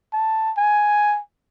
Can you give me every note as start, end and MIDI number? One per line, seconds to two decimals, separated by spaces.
0.13 0.52 81
0.57 1.20 80